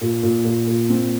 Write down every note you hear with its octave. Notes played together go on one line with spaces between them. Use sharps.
A#2
A#2
A#2
A#2
C4